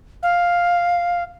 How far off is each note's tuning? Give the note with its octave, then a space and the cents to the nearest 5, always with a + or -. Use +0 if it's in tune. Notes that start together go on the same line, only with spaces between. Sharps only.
F5 +5